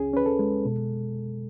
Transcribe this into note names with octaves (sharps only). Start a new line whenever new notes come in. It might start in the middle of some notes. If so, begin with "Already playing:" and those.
Already playing: C#2 C#4 G#4
C#4 B4
A4
G#3
B2